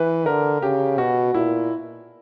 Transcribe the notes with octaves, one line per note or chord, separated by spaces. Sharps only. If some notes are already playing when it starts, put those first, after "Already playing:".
Already playing: E3 B4
D3 A#4
C#3 G4
B2 F#4
A#2 E4